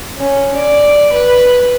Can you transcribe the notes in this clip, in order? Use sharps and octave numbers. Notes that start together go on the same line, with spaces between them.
C#4
D5
B4